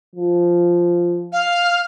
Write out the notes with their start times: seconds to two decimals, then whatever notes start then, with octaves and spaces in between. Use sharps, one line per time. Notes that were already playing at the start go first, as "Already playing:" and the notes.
0.15 F3
1.32 F5